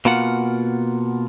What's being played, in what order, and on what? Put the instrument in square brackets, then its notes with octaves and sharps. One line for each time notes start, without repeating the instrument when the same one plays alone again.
[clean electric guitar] B2 A#3 F4 F#5